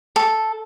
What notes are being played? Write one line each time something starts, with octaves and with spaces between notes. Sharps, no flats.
A4